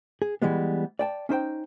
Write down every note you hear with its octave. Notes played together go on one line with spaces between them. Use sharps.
G#4
E3 G3 G#3 B3
D5 G5 A5
C#4 D#4 C5 G5